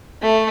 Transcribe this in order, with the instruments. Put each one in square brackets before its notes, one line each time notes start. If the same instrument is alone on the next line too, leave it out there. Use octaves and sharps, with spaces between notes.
[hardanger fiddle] A3